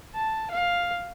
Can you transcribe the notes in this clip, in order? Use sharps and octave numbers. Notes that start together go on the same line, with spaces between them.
A5
F5